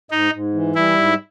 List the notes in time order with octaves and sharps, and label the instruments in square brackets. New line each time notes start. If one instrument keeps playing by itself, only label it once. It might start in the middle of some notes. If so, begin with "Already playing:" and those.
[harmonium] G#2 [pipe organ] D#4
[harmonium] G#2
E3
[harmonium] G3 [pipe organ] E4
[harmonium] G#2